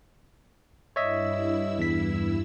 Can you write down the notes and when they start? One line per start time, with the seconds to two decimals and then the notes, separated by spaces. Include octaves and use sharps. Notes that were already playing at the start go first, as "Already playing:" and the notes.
0.96 G2 E4 C#5 D#5 E5 E6
1.78 E2 B6